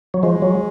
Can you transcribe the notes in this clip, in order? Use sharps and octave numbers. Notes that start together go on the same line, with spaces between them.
F#3
F3 G#3
F#3